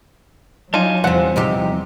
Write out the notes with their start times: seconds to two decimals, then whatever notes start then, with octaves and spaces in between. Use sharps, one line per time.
0.74 F#3 D4 D#4 F4 G#5
1.04 E2 C3 F3 G3 C4 C#4 F4 F#5
1.36 C3 D#4 G4